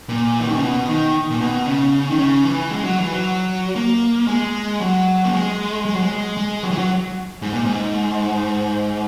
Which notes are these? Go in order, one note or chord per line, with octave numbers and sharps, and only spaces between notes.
A#2
E3
D#3
C#3
B2
D#3
A#2
B2
C#3
D#3
C#3
E3
G#3
F#3
E3
F#3
A#3
G#3
F#3
A#3
G#3
G#3
F#3
G#3
G#3
F#3
E3
F#3
G#2
A#2
G#2